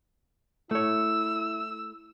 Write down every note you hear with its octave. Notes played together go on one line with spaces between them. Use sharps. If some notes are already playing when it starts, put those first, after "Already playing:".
A3 E4 C#5 E6